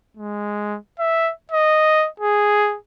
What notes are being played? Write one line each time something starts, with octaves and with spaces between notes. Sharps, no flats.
G#3
E5
D#5
G#4